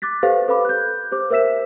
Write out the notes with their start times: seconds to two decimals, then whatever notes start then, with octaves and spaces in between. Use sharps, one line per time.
0.02 D6 F#6 A6 B6
0.23 G4 A4 B4 C5 F5
0.48 A4 B4 F5 B5 D6
0.65 F#6 G6
1.12 G4 C5 D6
1.30 A#4 C5 E5 E6 B6 E7